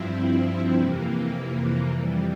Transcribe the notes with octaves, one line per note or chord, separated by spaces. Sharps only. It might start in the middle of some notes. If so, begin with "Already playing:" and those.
Already playing: G2 F3 C4 E4
F2 C3 E3 A#3
F2 E3 G3